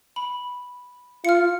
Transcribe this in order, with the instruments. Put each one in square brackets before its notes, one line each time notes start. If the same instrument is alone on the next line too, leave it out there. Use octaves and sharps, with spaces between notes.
[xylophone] B5
[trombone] F4 [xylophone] F6 C#7